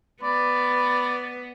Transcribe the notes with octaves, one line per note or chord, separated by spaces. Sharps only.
B3 D5 B5